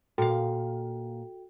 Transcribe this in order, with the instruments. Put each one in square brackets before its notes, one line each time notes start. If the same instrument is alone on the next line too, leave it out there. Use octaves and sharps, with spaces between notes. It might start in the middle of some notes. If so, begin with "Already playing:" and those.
[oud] A#2 F5 [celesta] F#4 A4 G5